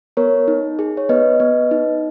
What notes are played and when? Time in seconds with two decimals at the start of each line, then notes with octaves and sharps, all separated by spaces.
0.17 B3 A#4 C#5
0.48 D#4
0.79 G#4
0.97 C#5
1.09 B3 B4 D#5
1.40 B3
1.71 D#4